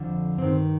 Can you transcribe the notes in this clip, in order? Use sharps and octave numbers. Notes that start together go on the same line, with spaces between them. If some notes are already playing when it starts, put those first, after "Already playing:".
Already playing: F2 D3 F3
G2 D#3 C4